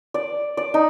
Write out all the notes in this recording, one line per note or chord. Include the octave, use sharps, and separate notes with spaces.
D5
D5
D#4